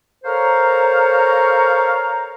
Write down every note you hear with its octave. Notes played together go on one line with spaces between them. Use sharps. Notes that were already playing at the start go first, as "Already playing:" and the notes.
A4 A#4 C5 C#5 F5 A#5